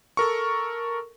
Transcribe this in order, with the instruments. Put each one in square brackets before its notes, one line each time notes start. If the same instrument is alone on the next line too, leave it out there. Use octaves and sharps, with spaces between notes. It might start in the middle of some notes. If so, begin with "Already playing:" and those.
[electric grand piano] A4 A#4 C#6